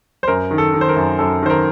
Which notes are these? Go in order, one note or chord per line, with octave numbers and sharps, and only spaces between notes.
C5
F#2 A#4
D#3
A4
D#3
C5
A#4
F#2
F#2 A4
D#3 C5
A#4